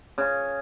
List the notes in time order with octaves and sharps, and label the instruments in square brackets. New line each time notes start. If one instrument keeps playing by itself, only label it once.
[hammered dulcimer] C#3